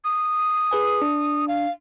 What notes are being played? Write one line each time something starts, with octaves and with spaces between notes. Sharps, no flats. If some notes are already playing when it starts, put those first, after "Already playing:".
D#6
G#4 B4 G#5
D4
F5